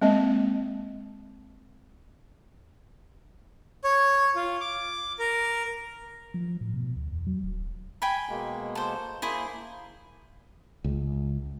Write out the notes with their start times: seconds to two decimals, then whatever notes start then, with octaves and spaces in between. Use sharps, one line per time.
0.02 G#3 A#3 C4 D#5
3.84 C#5
4.36 F4
4.61 D6
5.19 A#4
6.34 F3
6.61 A2
6.74 B2
6.96 D2
7.12 E2
7.27 F#3
7.44 D#1
8.02 G5 G#5 B5
8.29 B2 G#3 A#3
8.75 A4 C5
9.22 A#3 E4 G#4 C5
10.84 C#2